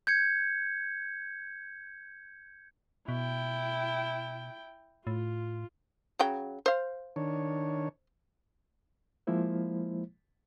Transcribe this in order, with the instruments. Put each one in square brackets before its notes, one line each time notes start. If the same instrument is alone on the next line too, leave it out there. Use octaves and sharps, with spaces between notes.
[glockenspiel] G6 G#6 C#7
[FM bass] B2 [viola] E4 G5
[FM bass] A2 [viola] F4
[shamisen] C#3 F#3 G5
C5 F5
[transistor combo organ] D#3 D4 C#5
[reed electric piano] F3 G#3 A#3 E4 C5